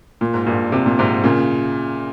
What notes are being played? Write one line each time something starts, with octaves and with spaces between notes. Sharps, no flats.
A#2
G#2
G2 A#2
C3
A#2
G#2 C3
A#2 C#3